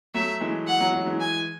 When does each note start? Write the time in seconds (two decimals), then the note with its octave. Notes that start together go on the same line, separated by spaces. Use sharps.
0.14 F#3 A3 E5
0.41 E3 G#3
0.67 F#5
0.80 F#3
0.93 F#3
1.06 E3 G#3
1.20 G#5